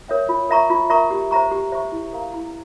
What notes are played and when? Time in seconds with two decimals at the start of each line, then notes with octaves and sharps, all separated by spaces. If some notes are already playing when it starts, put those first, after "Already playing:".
0.08 A#4 C#5 E5 G5
0.29 F4
0.49 A#4 E5 A#5 C#6
0.70 F4
0.90 A#4 E5 A#5 C#6
1.11 G4
1.31 C5 E5 A#5 C#6
1.52 G4
1.72 C5 E5 A#5 C#6
1.92 E4
2.13 A#4 F5 A#5
2.34 E4